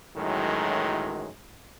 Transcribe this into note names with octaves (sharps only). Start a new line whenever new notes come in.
F#2 A2 D#3 E3 F#3 G#3